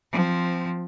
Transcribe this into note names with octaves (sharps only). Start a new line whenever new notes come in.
F3 C4